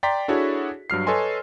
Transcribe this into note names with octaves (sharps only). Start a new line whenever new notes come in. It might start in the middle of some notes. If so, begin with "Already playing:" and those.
D5 G5 A#5 C6 B6
D4 E4 F#4 G#4 A4 C#5
G2 F#3 F6 C7
A4 B4 C#5 D#5 G#5 C6